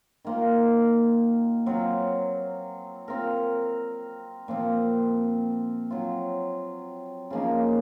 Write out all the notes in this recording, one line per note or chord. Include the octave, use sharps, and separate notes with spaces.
D#3 A#3 F4 C5
F#3 C4 F4
C4 F4 A#4
A#2 F3 C4
F#3 C4 F4
C#3 F3 A#3 D#4